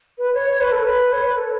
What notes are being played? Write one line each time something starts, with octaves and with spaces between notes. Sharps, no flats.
B4
C#5
C#5
B4
A4
B4
C#5
B4
A4